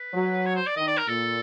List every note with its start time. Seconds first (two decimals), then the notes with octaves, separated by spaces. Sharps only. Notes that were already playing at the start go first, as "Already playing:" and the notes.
Already playing: B4
0.14 F#3
0.46 C#5
0.56 C5
0.66 D5
0.77 D#3 D#5
0.87 D5
0.98 A#4
1.08 A#2 A4